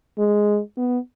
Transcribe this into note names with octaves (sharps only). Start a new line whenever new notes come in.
G#3
B3